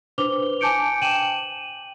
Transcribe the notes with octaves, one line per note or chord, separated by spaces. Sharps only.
D4 B4 C5 D6 F7 G7
G#5 A5 D6 G6 C#7 D7
G5 D#7 E7 F#7